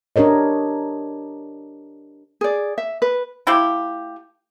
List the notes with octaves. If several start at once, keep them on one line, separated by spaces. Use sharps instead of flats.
D4 G4 A#4 C#5 D#5
G#4 D5
E5
B4
A3 E4 F4 G4